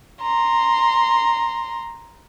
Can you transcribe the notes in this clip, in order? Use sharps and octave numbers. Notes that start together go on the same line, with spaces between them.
A#5 C6